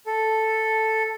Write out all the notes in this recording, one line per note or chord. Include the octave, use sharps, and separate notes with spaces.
A4